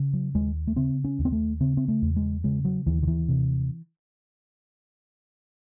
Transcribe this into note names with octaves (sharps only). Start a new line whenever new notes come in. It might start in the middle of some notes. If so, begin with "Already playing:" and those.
Already playing: C#3
F#3
D#2 G#3
A3
C#3 C4
C#4
D#2
C4
A3
C#3 C4
C4
A3
E2
G#3
C#3 G#3
F#3
D#2 E3
D#3
E3
C3